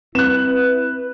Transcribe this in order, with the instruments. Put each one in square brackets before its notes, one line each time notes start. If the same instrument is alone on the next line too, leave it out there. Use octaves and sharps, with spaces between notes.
[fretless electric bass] C4 [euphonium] E4 [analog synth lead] B4 [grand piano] F#6 E7